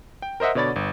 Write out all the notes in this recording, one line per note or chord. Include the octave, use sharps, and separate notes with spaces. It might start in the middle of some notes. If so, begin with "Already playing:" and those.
G5
A#4 C5 D#5 E5 F#5
B2 D3 C#5 D5 B5 A6
G1